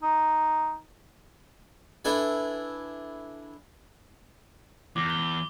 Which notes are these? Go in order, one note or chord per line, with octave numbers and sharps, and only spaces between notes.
D#4
D4 E4 A4 B4 G#5
E2 D6
G7